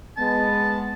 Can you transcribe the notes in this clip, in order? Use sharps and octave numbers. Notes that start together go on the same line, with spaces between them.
G#3 B3 A5